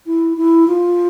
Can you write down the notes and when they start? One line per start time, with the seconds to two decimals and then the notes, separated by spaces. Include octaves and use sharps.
0.07 E4
0.37 E4
0.68 F4